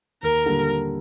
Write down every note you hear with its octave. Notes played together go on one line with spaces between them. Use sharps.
D#2 A#4
D3 G3 A#3